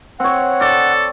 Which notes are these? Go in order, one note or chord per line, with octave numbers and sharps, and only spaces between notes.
C4 C#5 F#5
A4 D5